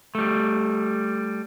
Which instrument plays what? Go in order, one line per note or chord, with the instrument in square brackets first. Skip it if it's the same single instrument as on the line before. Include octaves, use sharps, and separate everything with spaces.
[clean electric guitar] G3 A3